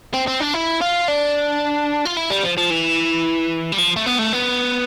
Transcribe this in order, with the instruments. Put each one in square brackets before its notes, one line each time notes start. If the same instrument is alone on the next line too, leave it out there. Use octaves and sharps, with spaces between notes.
[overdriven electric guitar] C4
C4
D4
E4
F4
D4
F4
E4
G3
F3
F3
E3
G3
F3
A3
B3
A3
B3